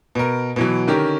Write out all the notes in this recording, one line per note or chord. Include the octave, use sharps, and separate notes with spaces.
B2 A#4
B2 E3 F#3
D3 D#3 C#4 G4 A#4